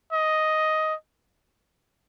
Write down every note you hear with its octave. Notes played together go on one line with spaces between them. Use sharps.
D#5